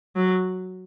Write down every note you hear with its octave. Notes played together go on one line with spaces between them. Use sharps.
F#3